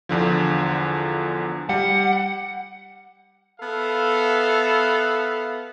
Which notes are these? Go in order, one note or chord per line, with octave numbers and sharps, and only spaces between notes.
E2 D3 F3
G3 F#5
B3 A4 E5 F5